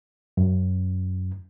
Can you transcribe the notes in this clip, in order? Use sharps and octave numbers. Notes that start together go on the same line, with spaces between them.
F#2